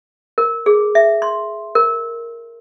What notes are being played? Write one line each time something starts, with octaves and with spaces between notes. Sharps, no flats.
A#4
G#4
E5
C6
A#4